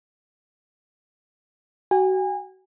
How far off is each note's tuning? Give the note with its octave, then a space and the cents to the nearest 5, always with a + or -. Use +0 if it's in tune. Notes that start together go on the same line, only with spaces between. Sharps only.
F#4 +30 G#5 -30